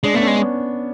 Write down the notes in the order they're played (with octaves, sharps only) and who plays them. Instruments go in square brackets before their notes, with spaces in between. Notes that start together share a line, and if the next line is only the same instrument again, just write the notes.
[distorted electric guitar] G#3 [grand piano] D4
[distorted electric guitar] A3 [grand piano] B3
[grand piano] C#4
[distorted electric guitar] G#3
[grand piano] C#4